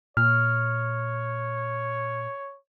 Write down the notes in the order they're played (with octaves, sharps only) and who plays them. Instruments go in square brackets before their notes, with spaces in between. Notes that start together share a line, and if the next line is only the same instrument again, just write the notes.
[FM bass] A#2 [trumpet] C#5 [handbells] F6